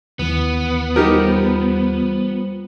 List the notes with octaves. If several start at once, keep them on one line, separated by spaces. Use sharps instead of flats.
D#2 E3 B3
G3 D#4 F4 G4 A#4 C5